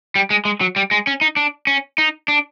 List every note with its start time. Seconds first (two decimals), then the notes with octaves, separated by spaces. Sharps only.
0.15 G3
0.30 G#3
0.45 G#3
0.61 F#3
0.76 G3
0.91 G#3
1.07 C#4
1.21 D#4
1.36 D4
1.67 C#4
1.98 D#4
2.28 D4